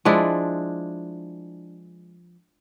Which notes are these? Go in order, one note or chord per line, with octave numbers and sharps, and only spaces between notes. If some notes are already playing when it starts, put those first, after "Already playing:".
F3 G#3 D4 E4